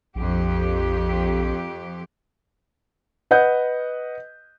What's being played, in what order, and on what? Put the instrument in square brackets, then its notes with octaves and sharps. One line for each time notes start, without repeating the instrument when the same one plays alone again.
[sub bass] A#1 [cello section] F2 G4
[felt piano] B4 D#5 F#5 G6